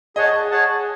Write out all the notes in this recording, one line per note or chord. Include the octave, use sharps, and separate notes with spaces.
G#4 C#5 D#5 F#5 A5
G#4 C#5 F#5 A5